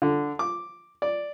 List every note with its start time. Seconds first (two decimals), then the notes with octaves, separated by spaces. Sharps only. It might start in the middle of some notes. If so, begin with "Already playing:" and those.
0.02 D3
0.39 D6
1.02 D5